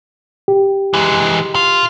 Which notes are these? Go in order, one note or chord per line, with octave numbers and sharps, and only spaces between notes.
G4
E3 G#3
F4